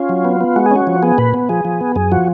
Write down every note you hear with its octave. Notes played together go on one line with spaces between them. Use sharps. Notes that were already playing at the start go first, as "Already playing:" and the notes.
Already playing: C#4 F4
F#3
B3
B3
G#3 F#4
G#4
C#4 F#4
F3
B3 G#4
A#2 B4
B3
F3 G#4
F3
B3
F#2 G#4
F3 F#4